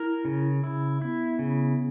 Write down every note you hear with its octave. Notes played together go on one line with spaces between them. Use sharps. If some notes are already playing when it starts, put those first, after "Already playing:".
Already playing: E4 A#4
C#3
E4
B3 E4
C#3